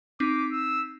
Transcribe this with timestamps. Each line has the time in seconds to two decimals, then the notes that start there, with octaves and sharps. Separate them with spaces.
0.20 C4 D#4 D6 B6
0.52 E6